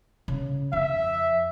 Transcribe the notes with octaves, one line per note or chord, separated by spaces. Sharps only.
C#3
F2 E5